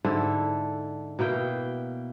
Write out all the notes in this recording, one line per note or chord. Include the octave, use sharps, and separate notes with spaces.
G#2 D3 E4 A4
B2 A#3 E4 G5